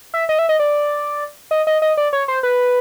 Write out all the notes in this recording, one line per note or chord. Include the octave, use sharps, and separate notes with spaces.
E5
D#5
E5
D#5
D5
D#5
D#5
D#5
D5
C#5
C5
B4